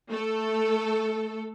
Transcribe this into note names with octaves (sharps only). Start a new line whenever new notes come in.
A3 A4